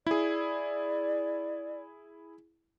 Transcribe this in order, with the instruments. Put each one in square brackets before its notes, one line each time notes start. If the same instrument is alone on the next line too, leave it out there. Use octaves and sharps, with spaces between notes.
[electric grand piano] E4 G#4 [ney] D5